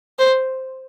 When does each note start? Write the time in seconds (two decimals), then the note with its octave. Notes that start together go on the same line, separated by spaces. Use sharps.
0.19 C5